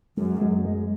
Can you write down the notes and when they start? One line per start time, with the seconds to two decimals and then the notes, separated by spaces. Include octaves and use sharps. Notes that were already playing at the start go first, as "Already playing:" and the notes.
0.17 F#2 G#3
0.41 G#3
0.65 G#3